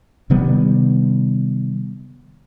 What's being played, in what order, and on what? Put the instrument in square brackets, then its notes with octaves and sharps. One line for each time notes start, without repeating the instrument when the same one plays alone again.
[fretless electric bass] C3 D#3 G3 B3